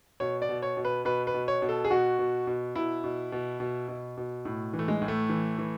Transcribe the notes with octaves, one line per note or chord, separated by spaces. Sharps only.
B2 C#5
D5
B2
C#5
B2
B4
B2 B4
B4
B2
C#5
B2
A4
G#4
B2 F#4
B2
B2
B2 E4
B2
B2
B2
B2
B2
A2
E3
A3
G#3
A2
A3
E3
E3